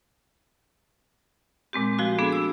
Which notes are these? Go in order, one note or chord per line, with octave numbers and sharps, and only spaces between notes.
A#2 G#3 C4 G4
F3 A3 F#4
A3 B3 D4 G#4 A4
E6